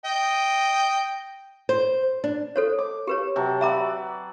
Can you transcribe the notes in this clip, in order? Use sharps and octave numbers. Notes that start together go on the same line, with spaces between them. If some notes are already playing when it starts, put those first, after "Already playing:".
D#5 G5
C5
D4
A4 C5 C#5
D6
G4 B4 C#5
C3 F#3 A5
F#3 B4 D5 E5 A#5 D6